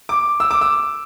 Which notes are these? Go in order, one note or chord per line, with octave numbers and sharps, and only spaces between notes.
D6
E6
D6
E6